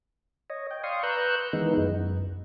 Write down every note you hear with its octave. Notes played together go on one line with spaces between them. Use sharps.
C#5 D#5
G5
D5 F5 C6 C#6 D#6
B4 A#5 C#6 E6 F#6 G6
D#3 E3 G#3 B3 D#4
F#2